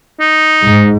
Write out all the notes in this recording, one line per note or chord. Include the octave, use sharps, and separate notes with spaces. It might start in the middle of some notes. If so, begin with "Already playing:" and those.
D#4
G#2